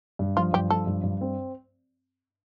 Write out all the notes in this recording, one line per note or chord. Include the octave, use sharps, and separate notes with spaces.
G2
F3 F4
G2 G4
F3 A4
G2
G2
C4